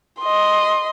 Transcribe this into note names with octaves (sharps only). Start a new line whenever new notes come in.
D#5 C6